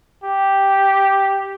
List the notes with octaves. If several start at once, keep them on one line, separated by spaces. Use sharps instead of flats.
G4